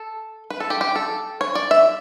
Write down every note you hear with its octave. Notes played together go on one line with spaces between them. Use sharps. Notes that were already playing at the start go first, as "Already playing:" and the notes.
Already playing: A4
B4
A4
G4
G4
A4
C#5
D5
E5